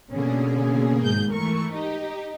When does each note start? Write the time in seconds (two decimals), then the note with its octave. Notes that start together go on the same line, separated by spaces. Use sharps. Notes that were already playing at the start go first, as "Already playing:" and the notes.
0.11 B2 D3 A#3 C#4 G#4
1.02 G#1 G#2 G6
1.32 E3 A3 A#4 C#6
1.71 D#4 G4